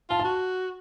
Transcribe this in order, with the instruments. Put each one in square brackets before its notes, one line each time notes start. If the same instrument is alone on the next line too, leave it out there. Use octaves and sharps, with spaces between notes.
[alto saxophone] F4 [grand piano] A5
[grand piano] A5
[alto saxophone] F#4